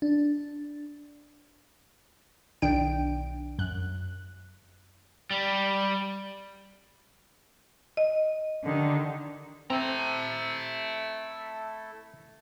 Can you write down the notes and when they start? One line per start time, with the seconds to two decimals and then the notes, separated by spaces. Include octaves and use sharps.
0.02 D4
2.62 B1 D#3 D4 G5 D7
3.59 F#2 F#6
5.31 G3
7.97 D#5
8.65 D3 D#3 G4
9.70 A3 C4 E4 A4 E5 A#5